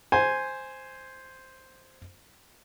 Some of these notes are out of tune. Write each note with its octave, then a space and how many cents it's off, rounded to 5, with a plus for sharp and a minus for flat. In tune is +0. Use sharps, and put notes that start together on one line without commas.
C5 +0 G#5 +0